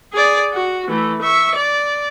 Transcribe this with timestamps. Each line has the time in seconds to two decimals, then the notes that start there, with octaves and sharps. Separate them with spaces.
0.13 G#4 D5
0.53 F#4
0.88 E3 A3
1.21 E5 C#6
1.54 D5